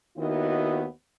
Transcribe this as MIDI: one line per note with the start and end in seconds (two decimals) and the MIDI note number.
0.17 0.84 39
0.17 0.84 51
0.17 0.84 59
0.17 0.84 64
0.17 0.84 66
0.17 0.84 75